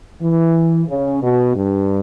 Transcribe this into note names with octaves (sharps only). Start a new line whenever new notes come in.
E3
C#3
B2
G2